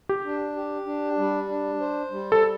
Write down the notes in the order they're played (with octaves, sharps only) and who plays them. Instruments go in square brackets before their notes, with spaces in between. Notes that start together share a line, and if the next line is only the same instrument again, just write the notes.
[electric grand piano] G4
[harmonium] D4
G4
D4
G3
D4
C5
G3
[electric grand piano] A4